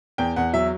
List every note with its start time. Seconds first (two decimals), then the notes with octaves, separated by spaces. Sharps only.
0.18 E2 G5
0.36 E2 F#5
0.53 F#3 E5